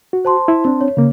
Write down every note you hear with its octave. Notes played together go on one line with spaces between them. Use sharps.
F#4
C5 A5 C6
E4
C4 D4
C#5
C#3 A#3